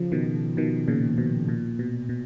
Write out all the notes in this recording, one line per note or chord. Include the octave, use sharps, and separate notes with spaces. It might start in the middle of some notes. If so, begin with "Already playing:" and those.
Already playing: C#3 F3
B2 D#3
B2 D#3
A#2 C#3
B2
A#2
B2
B2